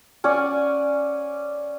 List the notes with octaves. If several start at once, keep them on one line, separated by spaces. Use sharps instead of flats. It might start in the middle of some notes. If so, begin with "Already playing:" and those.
C#4 D5 F#5 G#5